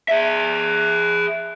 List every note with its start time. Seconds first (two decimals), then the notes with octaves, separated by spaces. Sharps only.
0.08 G#4 E5